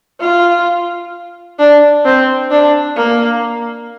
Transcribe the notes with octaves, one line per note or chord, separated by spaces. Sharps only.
F4
D4
C4
D4
A#3